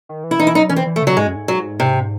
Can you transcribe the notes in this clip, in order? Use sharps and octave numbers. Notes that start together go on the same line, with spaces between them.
D#3
E3
E4
E3 D#4
E4
F#3 D#4
E3 C#4
C4
E3
A3
C#3 F#3
G#2 G#3
F#2
G#2
F#3
C3